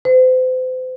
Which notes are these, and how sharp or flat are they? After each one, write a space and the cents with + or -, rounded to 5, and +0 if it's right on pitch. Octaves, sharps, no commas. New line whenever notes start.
C5 -40